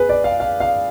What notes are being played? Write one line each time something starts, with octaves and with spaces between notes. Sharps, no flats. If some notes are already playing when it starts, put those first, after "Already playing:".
Already playing: G#4 B4
D5
F5
F5
F5